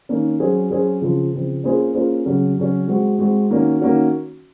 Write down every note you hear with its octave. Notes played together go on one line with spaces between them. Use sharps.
D#3 A#3 C#4
F#3 C#4 G#4 C5
F#3 C#4 G#4 C5
C#3 F3 C4
C#3 F3 C4
A#3 C#4 F4 G#4 C5
A#3 C#4 F4 G#4 C5
C#3 F#3 C#4
C#3 F#3 C#4
G#3 C4 F#4
G#3 C4 F#4
D#3 A#3 C#4 F#4
D#3 A#3 C#4 F#4